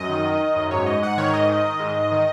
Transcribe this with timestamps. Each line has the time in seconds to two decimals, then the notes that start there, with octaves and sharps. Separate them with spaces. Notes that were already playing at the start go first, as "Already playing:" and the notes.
Already playing: F#2 D#5
0.09 D#3
0.25 D#3
0.40 D#3
0.56 F#2
0.71 G#2 C#5
0.86 G#2 D#5
1.02 G#2 F#5
1.18 D#3 C#5
1.34 G#2 D#5
1.49 D#3
1.65 D#3
1.80 G#2
1.96 G#2
2.12 D#3